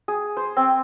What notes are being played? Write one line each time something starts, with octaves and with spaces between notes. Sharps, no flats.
G#4
C5
C4